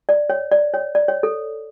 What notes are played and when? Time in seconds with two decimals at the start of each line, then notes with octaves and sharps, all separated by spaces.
0.09 D5
0.30 C#5
0.52 D5
0.74 C#5
0.95 D5
1.08 C#5
1.23 A4